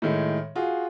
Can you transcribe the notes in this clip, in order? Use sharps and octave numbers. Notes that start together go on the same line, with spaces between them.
A2 D#3 G#3
F4 F#4 G#4